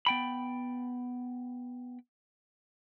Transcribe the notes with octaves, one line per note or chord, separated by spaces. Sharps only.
B3 G5 B5